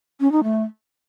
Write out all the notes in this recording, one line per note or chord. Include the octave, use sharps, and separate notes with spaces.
C#4
D#4
A3